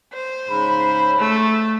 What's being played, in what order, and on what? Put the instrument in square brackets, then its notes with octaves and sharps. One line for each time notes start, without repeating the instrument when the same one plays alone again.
[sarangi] C5
[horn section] G#2 C#3 B5
[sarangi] A3